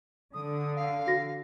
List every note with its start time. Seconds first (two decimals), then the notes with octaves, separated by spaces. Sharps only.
0.34 D3 D#6
0.76 F5
1.07 F#4 A#6